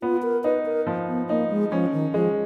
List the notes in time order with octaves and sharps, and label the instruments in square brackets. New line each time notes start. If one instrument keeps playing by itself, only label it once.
[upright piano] B3 [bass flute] F4
[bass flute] A#4
[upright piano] D#4 [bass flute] B4
[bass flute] A#4
[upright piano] F3
[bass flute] B3
[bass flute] A#3 [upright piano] D#4
[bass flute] G#3
[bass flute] F3 [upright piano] C#4
[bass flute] D#3
[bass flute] F3 [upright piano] G#3